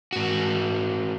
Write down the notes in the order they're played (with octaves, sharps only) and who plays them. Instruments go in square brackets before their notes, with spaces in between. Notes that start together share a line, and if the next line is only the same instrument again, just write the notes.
[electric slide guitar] G#2 F#4